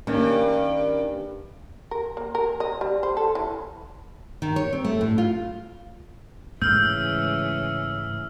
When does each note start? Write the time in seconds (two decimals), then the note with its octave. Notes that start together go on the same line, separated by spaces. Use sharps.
0.07 G2 D#3 A#3 C#4
1.91 A#4
2.17 A#3
2.35 A#4
2.60 D#5
2.81 G3
3.03 C5
3.17 A4
3.35 E3
4.42 D#3
4.56 C#5
4.73 C4
4.85 A3
5.01 A2
5.18 F4
6.62 G#2 C#3 E3 G#3 A3 E6 F6 G6